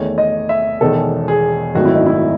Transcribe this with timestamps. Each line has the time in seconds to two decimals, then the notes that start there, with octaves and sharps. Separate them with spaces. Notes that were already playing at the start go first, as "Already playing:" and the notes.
Already playing: E2 D#3 A3 C#5
0.18 D#5
0.49 E5
0.81 E1 E2 D#3 A4
1.28 G#4
1.75 G#1 F#2 D#3 A3 F#4
1.85 E4
1.95 D#4
2.06 E4